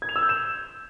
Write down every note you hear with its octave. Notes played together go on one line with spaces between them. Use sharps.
G#6
F7
E6
G6
E7